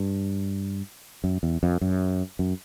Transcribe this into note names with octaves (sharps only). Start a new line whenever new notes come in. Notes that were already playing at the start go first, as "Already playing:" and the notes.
Already playing: G2
F#2
E2
F2
F#2
F#2